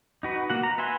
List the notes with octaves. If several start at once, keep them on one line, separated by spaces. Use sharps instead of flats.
D#4 F#4 B4
A#3 F#4 F#5
A#5
B4 E5 F#5 G#5 C6